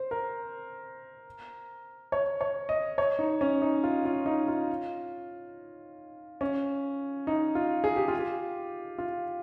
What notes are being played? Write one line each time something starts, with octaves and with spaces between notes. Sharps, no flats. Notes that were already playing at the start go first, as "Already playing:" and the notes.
Already playing: C5
A#4
C#5
C#5
D#5
C#5
D#4
C#4
D#4
F4
F4
D#4
F4
C#4
D#4
F4
G#4
G4
F4
G4
F4